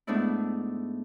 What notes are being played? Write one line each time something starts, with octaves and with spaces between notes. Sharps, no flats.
G#2 A3 B3 D4 E4